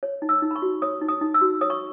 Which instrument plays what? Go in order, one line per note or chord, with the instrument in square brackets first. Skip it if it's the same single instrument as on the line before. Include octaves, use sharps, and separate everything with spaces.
[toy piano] C#5
D#4
E6
D#4
B5
C#6
F#4
C#5 D#6
D#4
D#6
D#4
E6
F#4
C#5 D#6
C#6